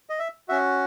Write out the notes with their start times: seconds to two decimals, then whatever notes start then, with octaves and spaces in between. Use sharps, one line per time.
0.10 D#5
0.19 E5
0.48 C#4 F#4 E5